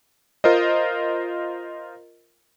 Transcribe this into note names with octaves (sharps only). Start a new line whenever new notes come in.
F4 A#4 C5 D#5